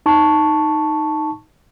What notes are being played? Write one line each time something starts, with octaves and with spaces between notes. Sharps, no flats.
D#4 A5 C#6